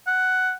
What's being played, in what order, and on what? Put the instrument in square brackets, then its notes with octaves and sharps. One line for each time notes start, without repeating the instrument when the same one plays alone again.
[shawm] F#5